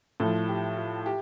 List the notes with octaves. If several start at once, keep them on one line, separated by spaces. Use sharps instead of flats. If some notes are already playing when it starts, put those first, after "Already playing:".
A2 F3 A4
G4
F4
G4